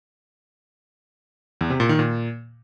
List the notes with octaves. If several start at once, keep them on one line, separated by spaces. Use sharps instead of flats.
E2
C3
A#2
D#3
A#2